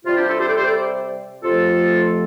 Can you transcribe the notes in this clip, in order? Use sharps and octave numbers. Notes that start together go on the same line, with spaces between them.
C3 G3 F4
D4 G4
F4 A4
G4 C5
A4 D5
G4 C5
A4 D5
F2 C3 F3 A3 F4 A4